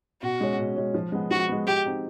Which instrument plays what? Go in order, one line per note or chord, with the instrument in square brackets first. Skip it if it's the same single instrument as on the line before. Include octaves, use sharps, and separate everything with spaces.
[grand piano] B2 [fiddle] F#4
[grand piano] G#3 C#4
B2
G#3 C#4
F3
G#3 B3
[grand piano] F3 [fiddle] F#4
[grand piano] G#3 B3
[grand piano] G#3 [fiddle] G4
[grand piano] C4 D#4 F#4